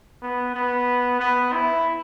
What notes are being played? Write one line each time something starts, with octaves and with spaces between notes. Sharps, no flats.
B3
B3
B3
E4